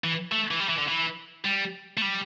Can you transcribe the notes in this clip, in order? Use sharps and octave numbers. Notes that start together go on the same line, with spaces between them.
E3
A3
E3
G3
E3
D3
E3
G3
A3
G3